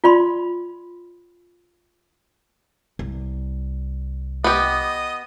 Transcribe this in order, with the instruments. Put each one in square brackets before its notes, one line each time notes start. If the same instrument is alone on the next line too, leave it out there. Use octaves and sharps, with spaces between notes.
[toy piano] F4 D5 B5 C6
[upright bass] C2
[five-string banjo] B3 G4 [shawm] D#5